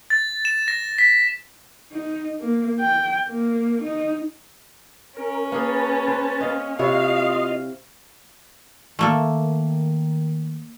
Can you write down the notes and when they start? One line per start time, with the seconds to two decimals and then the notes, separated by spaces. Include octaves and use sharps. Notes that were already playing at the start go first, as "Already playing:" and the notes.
0.10 A6
0.45 E7
0.68 A#6
0.98 B6
1.92 D#4
2.40 A#3
2.80 G5
3.29 A#3
3.82 D#4
5.17 C#4 A#4
5.52 A#3 G#4 B4 A5
6.08 C5
6.41 D#5 F5
6.79 C3 E4 F4 C#5 D#5 F5
8.99 D#3 A3 A#3 A4